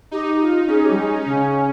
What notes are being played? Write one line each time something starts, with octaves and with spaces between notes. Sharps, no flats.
D#4 G4
F4
C#4 G#4
G4
G3
G#3
C#3 C#4